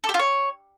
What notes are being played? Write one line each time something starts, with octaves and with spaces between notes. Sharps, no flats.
A4
G4
F4
C#5